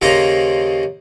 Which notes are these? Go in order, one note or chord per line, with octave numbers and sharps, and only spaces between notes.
D#2 C#3 C5 A#5